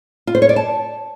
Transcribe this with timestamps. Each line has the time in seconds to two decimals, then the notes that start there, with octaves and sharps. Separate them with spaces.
0.27 F4
0.35 C5
0.42 C#5
0.49 D5
0.56 A5